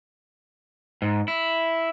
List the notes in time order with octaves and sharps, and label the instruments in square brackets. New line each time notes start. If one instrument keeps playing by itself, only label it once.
[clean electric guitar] G#2
E4